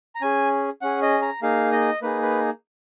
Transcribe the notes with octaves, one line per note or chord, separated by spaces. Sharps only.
A#5
C#4 G#4 G#5
C#4 G#4 F#5
D#5
A#5
A#3 D#4 G#4 F5
D#5
A#3 D#4 G#4 B4
B4